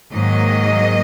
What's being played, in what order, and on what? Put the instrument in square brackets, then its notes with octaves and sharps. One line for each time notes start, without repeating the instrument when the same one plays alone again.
[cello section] G#2 D#3 F#3 A#3 D#5